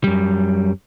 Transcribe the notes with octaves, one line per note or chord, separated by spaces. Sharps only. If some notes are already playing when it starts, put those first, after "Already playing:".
F#2 G3